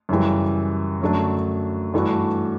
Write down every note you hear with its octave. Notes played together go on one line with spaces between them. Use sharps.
F#2 C#3 E3 G3
F#2 D3 F#3 A3 D4
G2 E3 A3 D4 F#4